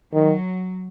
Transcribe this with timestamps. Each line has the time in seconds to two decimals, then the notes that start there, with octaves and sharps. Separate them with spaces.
0.13 D#3 F#3